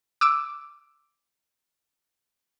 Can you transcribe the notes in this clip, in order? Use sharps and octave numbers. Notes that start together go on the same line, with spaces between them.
D6 E6 D7